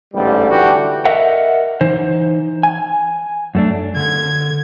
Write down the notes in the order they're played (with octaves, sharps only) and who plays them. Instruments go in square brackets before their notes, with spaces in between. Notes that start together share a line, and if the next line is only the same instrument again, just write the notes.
[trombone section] A1 G#2 D3 G3
D3 E3 D4 F#4 G4
[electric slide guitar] A#4 D#5 E5 F#5
E3 D#4 C5
G#5
F#2 A3 D4
[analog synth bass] D3 [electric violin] G#6